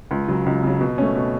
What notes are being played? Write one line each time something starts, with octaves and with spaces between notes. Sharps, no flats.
C#2
C#3 F#3
C#2
C#3 F#3
B2
A3 C#4
B2